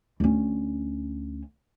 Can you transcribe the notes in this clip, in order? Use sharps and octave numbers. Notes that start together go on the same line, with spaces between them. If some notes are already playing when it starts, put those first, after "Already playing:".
D2 C#4